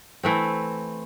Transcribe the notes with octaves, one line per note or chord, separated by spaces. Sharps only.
E3 A3 C4